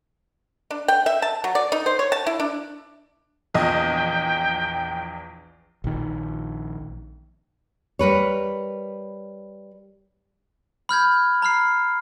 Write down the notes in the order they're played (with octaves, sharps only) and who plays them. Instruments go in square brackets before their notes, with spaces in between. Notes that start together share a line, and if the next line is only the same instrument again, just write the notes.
[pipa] D4
G5
E5
A5
F#3
D5
D#4
C5
C#5
A5
E4
D4
[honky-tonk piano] A#1 E2 D#5 [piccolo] G5
[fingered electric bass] A#1 D#3
[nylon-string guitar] G3 A#4 B4 C#5
[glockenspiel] B5 F6 G6 G#6
A#5 B5 F6 C7